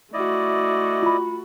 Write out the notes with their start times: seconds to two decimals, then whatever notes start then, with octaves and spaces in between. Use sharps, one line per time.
0.14 A3 E4 F#4 D5 D#5
1.03 F4 B5